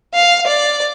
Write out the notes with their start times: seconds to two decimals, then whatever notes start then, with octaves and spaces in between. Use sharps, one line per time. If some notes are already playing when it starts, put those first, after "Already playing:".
0.15 F5
0.47 D5